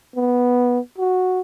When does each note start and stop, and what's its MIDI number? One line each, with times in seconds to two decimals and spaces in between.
0.16 0.79 59
0.98 1.41 66